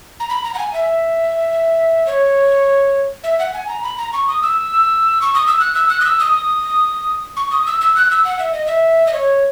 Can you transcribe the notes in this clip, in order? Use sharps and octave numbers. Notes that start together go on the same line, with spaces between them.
A#5
B5
A#5
F#5
G#5
E5
C#5
E5
F#5
G#5
A#5
B5
A#5
C#6
D#6
E6
C#6
D#6
E6
F#6
E6
F#6
D#6
E6
D#6
C#6
D#6
E6
E6
F#6
E6
F#5
E5
D#5
E5
D#5
C#5